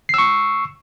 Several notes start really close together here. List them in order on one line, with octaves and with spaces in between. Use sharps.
C7 E6 C#6